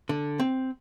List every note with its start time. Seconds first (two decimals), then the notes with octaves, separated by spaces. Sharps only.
0.09 D3
0.39 C4